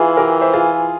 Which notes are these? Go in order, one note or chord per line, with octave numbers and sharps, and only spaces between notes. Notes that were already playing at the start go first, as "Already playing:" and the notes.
Already playing: E3 F4 G#4
G4 A#4
C5 E5
F4 G#4